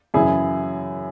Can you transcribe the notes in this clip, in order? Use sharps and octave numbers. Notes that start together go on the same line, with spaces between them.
F#2 C#3 E3 E4 G#4